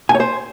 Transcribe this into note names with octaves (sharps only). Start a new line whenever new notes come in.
G#5
C#5
C5